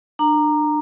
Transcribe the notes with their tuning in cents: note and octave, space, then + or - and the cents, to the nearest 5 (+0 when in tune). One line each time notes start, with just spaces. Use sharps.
D4 +30 A#5 -5